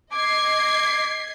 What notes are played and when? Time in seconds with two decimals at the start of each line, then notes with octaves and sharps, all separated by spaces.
0.12 D#5 D6 G#6 C7